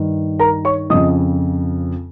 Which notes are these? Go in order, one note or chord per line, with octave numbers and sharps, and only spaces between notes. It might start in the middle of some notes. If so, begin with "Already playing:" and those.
Already playing: G2 D#3
A#4 A#5
C#5 C#6
F2 C#3 F3 D#5 D#6